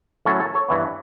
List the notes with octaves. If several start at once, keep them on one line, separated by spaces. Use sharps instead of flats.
A2 F#3 C#4 A4 C#5
A4 C#5
A4 C#5
G2 E3 B3